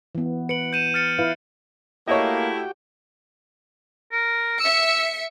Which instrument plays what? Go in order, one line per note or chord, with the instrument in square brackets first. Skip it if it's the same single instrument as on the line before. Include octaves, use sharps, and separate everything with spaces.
[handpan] E3 B3
[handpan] B4 [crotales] C#7 D7 F#7
[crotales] G6 D#7 E7
F6 A6 C#7
[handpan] E4 B4 F5
[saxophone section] A3 E4 [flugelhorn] A#3 [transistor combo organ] F#4 G4 G5 [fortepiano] C#5 D#5
[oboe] A#4
[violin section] E5 C#7 [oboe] E6